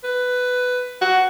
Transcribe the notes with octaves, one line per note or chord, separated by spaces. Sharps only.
B4
F#4